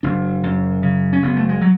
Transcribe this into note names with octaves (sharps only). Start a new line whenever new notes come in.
F#1 D4
F#2
C#3
C#4
F#1 B3
A3
G#3
F#3